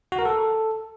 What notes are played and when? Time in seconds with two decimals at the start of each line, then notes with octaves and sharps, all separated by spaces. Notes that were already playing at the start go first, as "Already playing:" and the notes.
0.12 F#4
0.19 A#4
0.25 A4